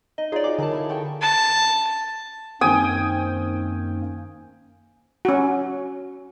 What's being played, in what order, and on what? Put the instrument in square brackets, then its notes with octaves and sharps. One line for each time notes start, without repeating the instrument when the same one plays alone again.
[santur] D#4 [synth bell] D#5
[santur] D#4 F4 C#5 [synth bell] G#4 D5
[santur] F#4 G#5 [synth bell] D6
[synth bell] D3 A5 [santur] G#4 A#4 F5
[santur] E4 E5 F5
A4 G5 C#6
[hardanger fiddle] A5
[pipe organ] F#2 A#3 [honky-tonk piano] D#3 C4 [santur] G5 G#5 D#6
[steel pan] C#4 F#4